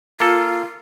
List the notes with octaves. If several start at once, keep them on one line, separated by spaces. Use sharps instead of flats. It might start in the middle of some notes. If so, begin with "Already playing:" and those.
A#3 F4 A4